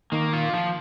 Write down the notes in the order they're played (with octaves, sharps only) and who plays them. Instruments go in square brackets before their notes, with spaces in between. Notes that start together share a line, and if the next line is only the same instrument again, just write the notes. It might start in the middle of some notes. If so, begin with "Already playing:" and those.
[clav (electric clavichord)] D#3 [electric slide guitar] A#3
[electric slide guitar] F4
F3